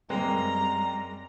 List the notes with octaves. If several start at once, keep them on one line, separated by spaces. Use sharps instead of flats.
F#2 G3 G#3 A#3 C4 A#5